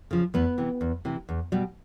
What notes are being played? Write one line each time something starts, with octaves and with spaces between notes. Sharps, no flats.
C#3 F3
E2 B3 B4
C3 E3
E2
C3 E3
E2
B2 G3